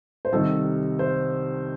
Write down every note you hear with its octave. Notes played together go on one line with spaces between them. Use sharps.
C5
C2 C3 D#3 A4
C5